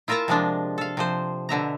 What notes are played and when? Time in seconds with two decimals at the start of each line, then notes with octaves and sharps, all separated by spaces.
0.08 E4 F4 A#4 E5 A5 A#5
0.28 C3 F3 G#3 D4
0.78 A4 F5
0.97 C3 F3 C5
1.49 B2 D3 E5 A#5